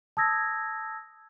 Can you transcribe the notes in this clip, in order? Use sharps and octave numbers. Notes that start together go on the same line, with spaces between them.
A5 D#6 E6 G#6 A#6